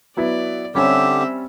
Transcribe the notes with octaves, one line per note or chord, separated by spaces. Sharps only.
F#3 B3 E4 D5
D3 G3 C4 C#4 G4 C#5 E5